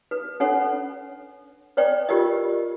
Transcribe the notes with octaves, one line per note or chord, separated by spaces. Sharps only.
B4
C#4 D4 A4 C#5 F#5
B4 C#5 D5 G5
F4 G4 A#4 D5 D#5